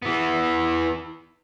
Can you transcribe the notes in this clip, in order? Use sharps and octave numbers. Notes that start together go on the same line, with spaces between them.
E3 B3